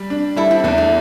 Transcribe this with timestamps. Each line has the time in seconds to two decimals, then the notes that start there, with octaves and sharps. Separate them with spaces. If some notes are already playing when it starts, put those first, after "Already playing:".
Already playing: G3
0.10 D4
0.36 G3 E4 A4
0.51 C4 E4
0.64 E2 A3 D4
0.78 A3